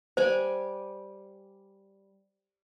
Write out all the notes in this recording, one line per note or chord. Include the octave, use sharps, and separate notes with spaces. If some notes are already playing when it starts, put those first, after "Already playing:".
G3 C5 G#5 D6